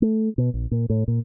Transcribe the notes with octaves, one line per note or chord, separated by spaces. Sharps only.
A3
B2
A#1
A#2
A2
A#2